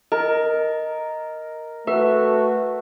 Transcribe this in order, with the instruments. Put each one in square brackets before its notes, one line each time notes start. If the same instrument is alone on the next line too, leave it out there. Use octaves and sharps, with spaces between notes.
[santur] A#4 [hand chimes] D#5
[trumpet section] A3 F#4 A4 [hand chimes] B4 [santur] E5